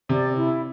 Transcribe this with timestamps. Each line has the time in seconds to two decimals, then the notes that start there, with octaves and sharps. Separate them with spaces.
0.09 C3 D5
0.36 E4